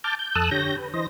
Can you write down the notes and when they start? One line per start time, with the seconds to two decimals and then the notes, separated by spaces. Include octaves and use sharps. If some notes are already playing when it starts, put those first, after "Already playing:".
0.04 A5 D6 F6 G6
0.19 G6
0.35 F2 A4 A5 D#6 E6 F#6
0.51 D3 G4 C#5 G6 A#6
0.78 B4
0.94 E3 C5 D#5 A#6